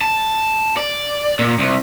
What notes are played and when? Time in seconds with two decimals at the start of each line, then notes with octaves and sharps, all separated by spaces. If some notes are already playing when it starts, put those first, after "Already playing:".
0.01 A5
0.77 D5
1.39 A#2
1.59 C2